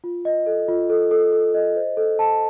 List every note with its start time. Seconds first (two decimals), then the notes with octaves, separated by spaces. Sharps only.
0.04 F4
0.25 D#5
0.46 A4
0.68 F4
0.90 A4
1.11 A4
1.32 A4
1.54 D#5
1.76 C5
1.97 A4
2.19 A5